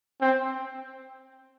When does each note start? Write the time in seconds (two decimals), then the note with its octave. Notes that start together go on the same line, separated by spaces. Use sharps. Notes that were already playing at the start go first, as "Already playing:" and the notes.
0.21 C4